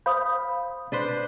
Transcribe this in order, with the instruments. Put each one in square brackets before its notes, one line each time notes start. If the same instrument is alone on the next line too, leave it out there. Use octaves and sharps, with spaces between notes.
[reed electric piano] C5 F5 B5 [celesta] D#6 G6
[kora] D4 B4 C5